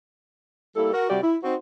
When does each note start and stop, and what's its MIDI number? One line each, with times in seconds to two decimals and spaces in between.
0.76 0.91 55
0.76 0.91 58
0.76 0.91 64
0.76 0.91 69
0.93 1.07 66
0.93 1.07 70
1.09 1.20 48
1.09 1.20 55
1.09 1.20 66
1.09 1.20 67
1.09 1.20 74
1.23 1.36 64
1.43 1.54 60
1.43 1.54 63
1.43 1.54 66
1.43 1.54 72